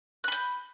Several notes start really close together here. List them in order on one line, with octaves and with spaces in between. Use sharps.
F#6 B5 G6